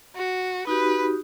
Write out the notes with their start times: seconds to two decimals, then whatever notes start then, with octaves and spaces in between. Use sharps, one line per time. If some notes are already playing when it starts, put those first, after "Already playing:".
0.16 F#4
0.67 D#4 F#4 G4 B4